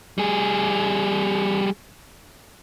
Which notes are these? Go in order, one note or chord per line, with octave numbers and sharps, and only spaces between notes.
G3 G#4